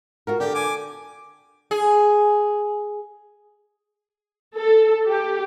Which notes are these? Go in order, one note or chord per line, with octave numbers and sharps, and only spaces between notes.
F4 F#4 A#4
D3 G4
G#5 D6
G#4
A4
G4